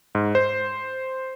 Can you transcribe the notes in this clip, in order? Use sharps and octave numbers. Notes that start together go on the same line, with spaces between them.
G#2
C5